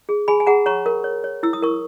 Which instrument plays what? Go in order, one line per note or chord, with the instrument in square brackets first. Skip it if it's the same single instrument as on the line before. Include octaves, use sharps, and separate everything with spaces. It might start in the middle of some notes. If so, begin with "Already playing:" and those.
[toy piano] G#4
G#4 G#5 B5
G#5
G#4 F#5 A#5
C#5 A#5 C#6
A#4
C#5
C#5
E4 E6
D#6
A#4 C#6